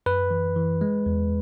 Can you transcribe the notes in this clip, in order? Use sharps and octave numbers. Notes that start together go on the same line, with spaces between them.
F#2 B4
E3
E3
G#3
E2